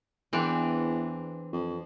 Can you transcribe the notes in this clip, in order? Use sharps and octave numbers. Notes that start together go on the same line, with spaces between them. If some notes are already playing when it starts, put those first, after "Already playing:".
E2 E3 C4 D4
F2